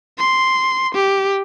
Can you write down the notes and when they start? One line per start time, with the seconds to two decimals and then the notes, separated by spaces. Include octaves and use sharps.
0.18 C6
0.94 G4